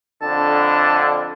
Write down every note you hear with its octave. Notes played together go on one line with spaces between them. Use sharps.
F2 D3 A5